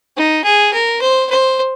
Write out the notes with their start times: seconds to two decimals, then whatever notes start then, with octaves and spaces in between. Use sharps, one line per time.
0.17 D#4
0.44 G#4
0.73 A#4
1.01 C5
1.30 C5